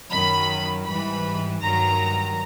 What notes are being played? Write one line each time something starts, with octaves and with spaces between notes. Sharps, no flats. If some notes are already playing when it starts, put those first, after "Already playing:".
F#2 D#3 F#3 B5
G#2 E3 G3 B5
G2 D#3 F#3 A#5